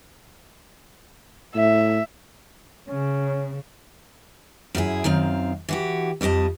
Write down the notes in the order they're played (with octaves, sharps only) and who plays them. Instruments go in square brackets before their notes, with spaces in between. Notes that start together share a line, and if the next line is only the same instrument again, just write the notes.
[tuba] A2 [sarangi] E5
[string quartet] C#3 [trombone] C#4
[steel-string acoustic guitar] F#2 E4 G4 G#4
F#2 D#3 C4 F5
E3 F#4 G4
F2 G3 D#4 D#5 A5